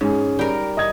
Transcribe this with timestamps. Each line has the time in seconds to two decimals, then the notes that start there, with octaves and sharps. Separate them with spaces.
0.01 G#2 C#4 G#4
0.39 G3 A#4 G5
0.77 D#5 D#6 G#6